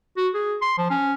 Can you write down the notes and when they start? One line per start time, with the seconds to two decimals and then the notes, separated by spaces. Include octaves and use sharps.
0.17 F#4
0.34 G#4
0.62 C6
0.78 F3
0.91 C#4